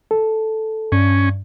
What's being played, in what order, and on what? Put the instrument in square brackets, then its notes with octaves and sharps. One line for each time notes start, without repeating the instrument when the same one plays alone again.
[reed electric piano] A4
[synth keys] G2 [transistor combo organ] C#4